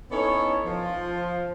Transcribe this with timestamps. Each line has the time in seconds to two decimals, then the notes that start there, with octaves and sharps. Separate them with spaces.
0.10 B3 C#4 D#4 E4 A4 C#5
0.65 F3